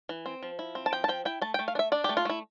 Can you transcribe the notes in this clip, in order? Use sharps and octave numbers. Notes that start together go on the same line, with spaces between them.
E3
C4
F3
E4
C4
A5
F3 G5
A5
F3 G5
E4 G5
A3 A5
G5
A3
F5
D4
E5
D4 D5
G4
A3
F4
A3 E4